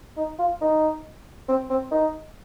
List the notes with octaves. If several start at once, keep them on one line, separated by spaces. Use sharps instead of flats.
D#4
F4
D#4
C4
C4
D#4